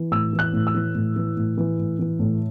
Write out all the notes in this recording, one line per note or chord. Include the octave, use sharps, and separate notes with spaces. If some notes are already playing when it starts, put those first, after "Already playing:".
Already playing: E3
A2 E6
E3
F#6
A2
E6
E3
A2
E3
A2
E3
A2
E3
A2